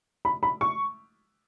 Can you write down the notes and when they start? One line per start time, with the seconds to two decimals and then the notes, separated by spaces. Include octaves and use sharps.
0.25 B5
0.43 B5
0.61 C#6